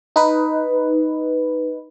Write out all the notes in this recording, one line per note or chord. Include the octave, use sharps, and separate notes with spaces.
D#4 B4